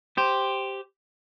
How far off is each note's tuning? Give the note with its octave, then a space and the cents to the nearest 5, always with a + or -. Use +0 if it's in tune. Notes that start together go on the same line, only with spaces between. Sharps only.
G4 +0 C5 +0